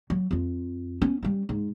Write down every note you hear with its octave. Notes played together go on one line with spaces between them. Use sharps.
F#3
F2 F4
B3 C#4
G3 C#4
G#2